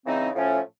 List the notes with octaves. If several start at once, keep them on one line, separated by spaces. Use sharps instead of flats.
C#3 E3 G#3 C4 D#4
A2 F3 A3 C#4